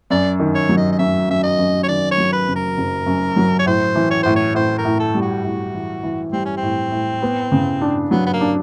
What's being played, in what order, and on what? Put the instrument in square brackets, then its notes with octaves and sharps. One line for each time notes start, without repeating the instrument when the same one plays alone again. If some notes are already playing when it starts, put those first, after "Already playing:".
[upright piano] F#2 [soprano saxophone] D5
[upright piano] D#3
[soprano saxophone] C#5
[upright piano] F#3
[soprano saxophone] D#5
D#5
[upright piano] F#2 [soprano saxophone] E5
[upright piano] F#2 [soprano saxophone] E5
[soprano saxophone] D#5
[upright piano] F#2
[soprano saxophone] C#5
[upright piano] D#3 [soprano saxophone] D5
[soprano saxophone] C#5
[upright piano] F#3
[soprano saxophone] B4
[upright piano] F#1
[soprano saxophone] A#4
[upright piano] F#1
F#2
F#3
[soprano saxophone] C#5
[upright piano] A2 [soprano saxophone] C5
[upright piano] E3
[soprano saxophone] C#5
[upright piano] A2 [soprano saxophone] C5
[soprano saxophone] C#5
[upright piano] A2 [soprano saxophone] C5
[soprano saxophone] A#4
[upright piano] A2
[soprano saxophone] A4
[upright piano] G3
[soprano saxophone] F#4
[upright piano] A2
E3
E3
[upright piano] G3 [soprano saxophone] C4
[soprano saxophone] C#4
C4
[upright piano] A2
A2
B3
C#3
D4
[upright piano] F#3 [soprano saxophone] B3
[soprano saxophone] B3
A#3
[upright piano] D4